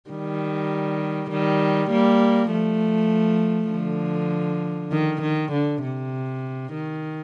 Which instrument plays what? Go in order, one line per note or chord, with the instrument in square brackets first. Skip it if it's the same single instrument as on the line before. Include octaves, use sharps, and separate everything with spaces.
[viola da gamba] D#3 G3
D#3 G3
G3 A#3
F3 A3
D3 F3
D#3
D#3
D3
C3
D#3